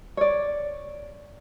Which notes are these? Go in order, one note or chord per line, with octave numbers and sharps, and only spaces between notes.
C#5 D5